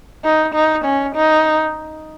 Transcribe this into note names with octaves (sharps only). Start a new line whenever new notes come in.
D#4
D#4
C#4
D#4